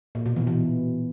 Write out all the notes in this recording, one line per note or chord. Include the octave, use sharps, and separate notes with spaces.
A#2
B2
E3
B2